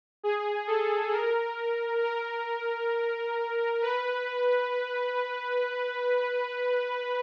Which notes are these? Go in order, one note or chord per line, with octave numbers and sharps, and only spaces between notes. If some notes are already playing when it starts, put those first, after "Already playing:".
G#4
A4
A#4
A#4
B4